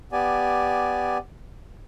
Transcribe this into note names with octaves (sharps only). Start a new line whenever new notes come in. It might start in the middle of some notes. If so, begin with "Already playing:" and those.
B3 G4 D5 G#5